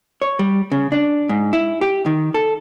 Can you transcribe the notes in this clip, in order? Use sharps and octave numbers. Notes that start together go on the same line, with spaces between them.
C#5
G3
C#3
D4
G#2
E4
G4
D#3
A4